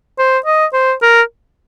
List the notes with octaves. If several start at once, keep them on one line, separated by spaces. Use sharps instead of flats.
C5
D#5
C5
A#4